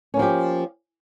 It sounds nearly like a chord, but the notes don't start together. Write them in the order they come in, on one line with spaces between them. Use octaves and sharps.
C#4 A#3 F3 G4